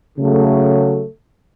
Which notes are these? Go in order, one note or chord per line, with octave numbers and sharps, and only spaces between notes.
C#3 F#3 A3